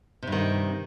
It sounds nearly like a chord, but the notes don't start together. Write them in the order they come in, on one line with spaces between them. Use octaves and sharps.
C3 G2 D#3